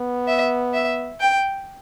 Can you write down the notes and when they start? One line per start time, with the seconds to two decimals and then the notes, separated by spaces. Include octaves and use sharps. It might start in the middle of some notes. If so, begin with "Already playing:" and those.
Already playing: B3
0.28 E5
0.74 E5
1.20 G5